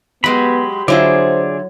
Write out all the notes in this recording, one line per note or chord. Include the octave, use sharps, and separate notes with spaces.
F#3 G#3 B3 G4 B5
D3 F#3 E4 F4 G#4 C5 D5